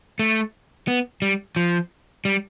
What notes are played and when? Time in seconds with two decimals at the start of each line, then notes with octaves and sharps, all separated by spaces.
0.19 A3
0.88 B3
1.22 G3
1.56 F3
2.25 G3